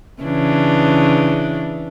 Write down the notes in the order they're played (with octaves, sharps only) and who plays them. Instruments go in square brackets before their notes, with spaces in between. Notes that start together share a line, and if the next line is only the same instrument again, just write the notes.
[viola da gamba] C#3 E3 D4